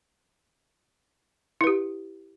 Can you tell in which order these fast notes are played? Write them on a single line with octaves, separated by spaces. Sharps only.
E4 B4 G4